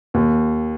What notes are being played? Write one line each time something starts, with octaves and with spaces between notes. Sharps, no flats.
D#2